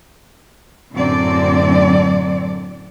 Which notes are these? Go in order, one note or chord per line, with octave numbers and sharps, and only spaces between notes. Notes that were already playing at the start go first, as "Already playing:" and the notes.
F#2 A2 D3 F#3 C4 D5